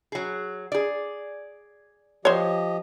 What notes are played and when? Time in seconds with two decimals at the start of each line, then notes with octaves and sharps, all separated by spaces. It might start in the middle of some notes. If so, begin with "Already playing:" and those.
0.12 F#3 G#4
0.72 G#4 D5
2.25 F3 G4 C5 C#5 D#5